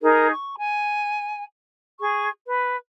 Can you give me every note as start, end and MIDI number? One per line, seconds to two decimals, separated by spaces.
0.01 0.30 63
0.01 0.30 68
0.01 0.30 70
0.31 0.55 85
0.59 1.45 80
2.01 2.29 68
2.01 2.29 85
2.46 2.77 71